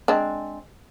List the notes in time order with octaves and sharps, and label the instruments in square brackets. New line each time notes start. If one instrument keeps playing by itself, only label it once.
[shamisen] G#3 C4 D4